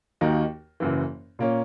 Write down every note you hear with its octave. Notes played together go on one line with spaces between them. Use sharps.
D#2 D#3 A#3 D#4 F#4
F#1 F#2 E3
A#2 A#3 C#4